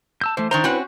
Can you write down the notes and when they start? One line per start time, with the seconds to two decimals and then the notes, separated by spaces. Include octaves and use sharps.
0.21 A5 E6 G6
0.37 E3 A3 C5
0.51 D#3 D4 C5 A#5 C#6
0.64 C4 C#4 E4 F#4 B4 C5